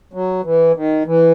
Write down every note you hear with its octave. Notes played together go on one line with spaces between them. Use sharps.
F#3
E3
D#3
E3